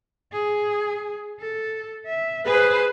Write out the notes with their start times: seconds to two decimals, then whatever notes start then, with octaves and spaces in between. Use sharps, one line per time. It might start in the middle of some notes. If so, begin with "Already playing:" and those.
0.32 G#4
1.40 A4
2.06 E5
2.47 G#4 B4 C5